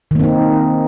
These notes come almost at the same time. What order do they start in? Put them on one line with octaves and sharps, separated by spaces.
D#3 A#3 C4 D#4